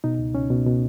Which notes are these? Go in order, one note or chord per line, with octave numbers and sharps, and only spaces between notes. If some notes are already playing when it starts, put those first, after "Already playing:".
B2 D#4
C#2
C#2 C#4
B2
B2